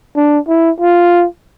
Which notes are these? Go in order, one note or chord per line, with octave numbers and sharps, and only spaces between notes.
D4
E4
F4